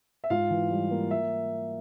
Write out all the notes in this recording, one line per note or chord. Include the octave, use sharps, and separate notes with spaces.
E5
G#2 F4 F5
E3
G3
A#3
E5